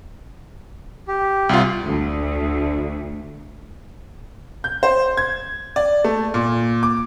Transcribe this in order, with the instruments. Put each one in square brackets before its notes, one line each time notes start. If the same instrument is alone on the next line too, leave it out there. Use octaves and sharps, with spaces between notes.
[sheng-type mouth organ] G4
[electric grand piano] C2 F4
[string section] D2
[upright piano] G6
C5
G#6
D5
A3
A#2
D6